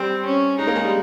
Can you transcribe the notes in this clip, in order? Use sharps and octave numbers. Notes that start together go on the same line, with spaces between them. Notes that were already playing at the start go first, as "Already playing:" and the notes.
Already playing: G3 C4
C#4
G#3 D#4
A#3
G#3
G3